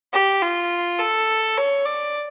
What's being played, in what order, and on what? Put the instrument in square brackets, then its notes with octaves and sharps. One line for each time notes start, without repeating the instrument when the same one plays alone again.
[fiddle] G4
F4
A4
C#5
D5